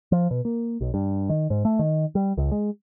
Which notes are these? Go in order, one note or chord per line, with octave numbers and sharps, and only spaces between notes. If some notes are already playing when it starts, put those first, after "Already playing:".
F3
B2
A#3
B1
G2
D#3
G#2
A3
D#3
G3
C#2
G#3